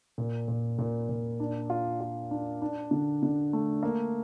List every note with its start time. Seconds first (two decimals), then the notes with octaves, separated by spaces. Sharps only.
0.18 A#2
0.48 A#2
0.79 A#2
1.09 A#2
1.40 D4
1.70 F4
2.01 F4
2.31 D4
2.62 D4
2.91 D3
3.23 D3
3.53 A3
3.83 A#3